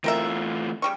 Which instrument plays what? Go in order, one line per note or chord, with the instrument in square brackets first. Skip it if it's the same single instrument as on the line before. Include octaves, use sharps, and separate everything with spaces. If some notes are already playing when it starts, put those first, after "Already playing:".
[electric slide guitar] E3 A3 F4 [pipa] C4 A#4 E5
[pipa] C#3 G3 C#6